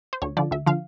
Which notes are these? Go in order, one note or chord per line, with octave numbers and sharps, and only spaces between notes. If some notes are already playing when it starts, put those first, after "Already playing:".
C5
D2 C#5
D3 F3 D5
D2 E5
D3 F3 F5